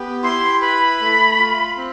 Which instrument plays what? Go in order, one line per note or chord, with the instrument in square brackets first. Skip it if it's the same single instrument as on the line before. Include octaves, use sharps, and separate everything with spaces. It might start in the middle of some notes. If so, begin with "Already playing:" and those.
Already playing: [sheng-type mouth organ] B3 G4
[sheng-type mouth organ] E4 [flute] C6
[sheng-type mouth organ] B4 [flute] B5
[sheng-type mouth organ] A3
F4
C4